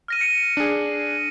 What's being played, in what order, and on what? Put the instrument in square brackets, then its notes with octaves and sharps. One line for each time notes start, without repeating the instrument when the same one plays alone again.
[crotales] F6 A#6 D#7
C#7
[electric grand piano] D4 G#4